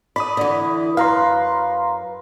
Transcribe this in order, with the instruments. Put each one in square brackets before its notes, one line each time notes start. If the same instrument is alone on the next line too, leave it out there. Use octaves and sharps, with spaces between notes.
[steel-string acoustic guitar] A4 D5 [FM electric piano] B5 D#6
[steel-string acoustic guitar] D3 E3
[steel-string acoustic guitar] F#2 B4 [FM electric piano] F5 A#5 C6